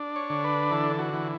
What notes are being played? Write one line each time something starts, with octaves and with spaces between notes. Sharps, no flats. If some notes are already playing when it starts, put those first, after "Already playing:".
Already playing: D4
C#5
D3
B4
E3 A4
F#4
E3